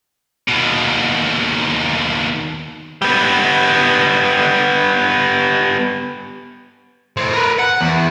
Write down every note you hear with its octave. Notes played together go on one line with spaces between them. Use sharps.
D#2 B2
G3 B3
A2 C4
A#4 B4
F#5
E2